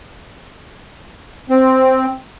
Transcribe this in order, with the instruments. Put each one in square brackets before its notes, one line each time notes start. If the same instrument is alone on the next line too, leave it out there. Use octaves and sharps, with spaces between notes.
[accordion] C4